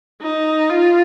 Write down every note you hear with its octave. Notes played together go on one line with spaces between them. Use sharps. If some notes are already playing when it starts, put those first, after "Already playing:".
D#4
F4